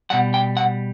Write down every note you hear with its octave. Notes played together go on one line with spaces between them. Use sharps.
B2 G3 F#5
G5
F#5